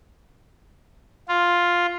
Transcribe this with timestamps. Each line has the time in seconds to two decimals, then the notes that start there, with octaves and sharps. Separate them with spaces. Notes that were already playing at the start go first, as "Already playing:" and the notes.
1.28 F4